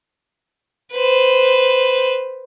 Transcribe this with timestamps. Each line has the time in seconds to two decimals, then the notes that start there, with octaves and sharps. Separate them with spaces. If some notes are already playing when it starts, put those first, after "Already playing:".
0.93 B4 C5